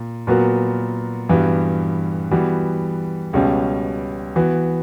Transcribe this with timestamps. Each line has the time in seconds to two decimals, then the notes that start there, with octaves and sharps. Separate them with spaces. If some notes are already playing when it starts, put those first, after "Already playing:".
Already playing: A#2
0.27 A#2 F#3 B3 F#4 A#4
1.29 G2 E3 G3 B3 F#4
2.31 E3 G3 B3 F#4
3.33 C#2 B2 G3 C#4
4.36 E3 B3 F#4